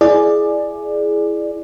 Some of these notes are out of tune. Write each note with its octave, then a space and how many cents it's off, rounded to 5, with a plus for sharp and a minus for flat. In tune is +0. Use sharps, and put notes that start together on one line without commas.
E4 +15 G#4 +15 D5 +15